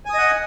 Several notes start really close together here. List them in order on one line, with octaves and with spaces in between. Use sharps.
G#5 D#6 D#5 F#5